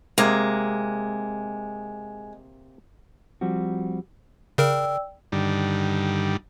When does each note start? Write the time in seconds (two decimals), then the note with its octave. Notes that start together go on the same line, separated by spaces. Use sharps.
0.18 C3 G#3 A#3
3.41 F3 G3 C4 F#4
4.58 C#3 A#4 D5 G5 E6
5.32 G2 D3 D#3 G3